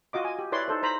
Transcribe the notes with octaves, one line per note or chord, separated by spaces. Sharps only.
F4 F#4 D#5 D6
G#5
G4
E4 B4 C#5 D5 C6
D#4 A4 C5
C5 A#5 B5